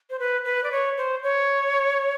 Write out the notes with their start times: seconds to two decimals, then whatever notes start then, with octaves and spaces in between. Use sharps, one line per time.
0.10 C5
0.19 B4
0.45 B4
0.64 D5
0.72 C#5
0.98 C5
1.23 C#5